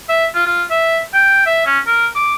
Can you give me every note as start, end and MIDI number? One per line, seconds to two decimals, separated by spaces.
0.09 0.26 76
0.35 0.46 65
0.46 0.64 65
0.70 0.99 76
1.14 1.42 79
1.46 1.62 76
1.67 1.80 61
1.87 2.08 70
2.15 2.34 86